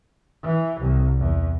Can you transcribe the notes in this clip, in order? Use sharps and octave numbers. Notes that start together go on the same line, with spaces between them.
E3
C2
E2